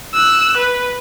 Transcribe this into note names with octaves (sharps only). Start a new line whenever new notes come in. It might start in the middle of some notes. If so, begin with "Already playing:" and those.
E6 F#6
B4